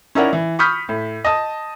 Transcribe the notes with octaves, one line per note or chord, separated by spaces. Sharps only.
C#4 D#4 E4 A#4 D5 F#5
E3
B5 C#6 D#6 F6 G6 B6
A2
D#5 A5 D#6